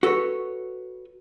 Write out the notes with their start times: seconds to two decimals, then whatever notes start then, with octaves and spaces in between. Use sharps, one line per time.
0.03 F#4 A4 B4 C#5